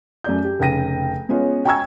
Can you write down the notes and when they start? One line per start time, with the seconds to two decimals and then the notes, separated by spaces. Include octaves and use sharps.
0.24 F#2 A3 D5 G6
0.44 G4
0.59 F1 C#3 G5 A#6 D#7
1.29 G#3 B3 C#4 F4 C#5
1.65 G5 G#5 A#5 C#6 E6 G#6